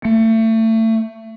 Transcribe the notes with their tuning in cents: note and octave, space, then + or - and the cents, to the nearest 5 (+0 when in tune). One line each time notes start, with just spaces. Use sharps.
A3 +30